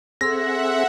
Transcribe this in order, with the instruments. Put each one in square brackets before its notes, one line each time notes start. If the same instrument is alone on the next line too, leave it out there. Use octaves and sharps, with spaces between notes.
[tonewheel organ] C4 G#4 [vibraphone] A4 C6 E6 [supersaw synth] E5 F#5 [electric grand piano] A#6